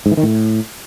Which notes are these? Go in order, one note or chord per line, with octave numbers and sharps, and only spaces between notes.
G#2
E3
D#3
A2